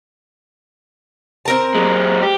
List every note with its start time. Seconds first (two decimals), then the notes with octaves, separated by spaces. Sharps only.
1.45 C4 A#4 A5
1.75 F#3 G#3
2.21 G4